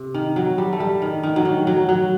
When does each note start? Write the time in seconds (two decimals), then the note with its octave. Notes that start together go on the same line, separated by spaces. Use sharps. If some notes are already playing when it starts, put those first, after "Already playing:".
Already playing: C3
0.14 D#3
0.36 F#3
0.58 G3
0.73 A3
0.80 G3
1.02 D#3
1.23 D#3
1.36 F#3
1.45 D#3
1.67 F#3
1.89 F#3